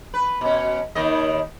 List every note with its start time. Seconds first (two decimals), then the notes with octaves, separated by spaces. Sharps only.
0.14 B4
0.41 B2 C#4
0.95 D#2 D#3 D#5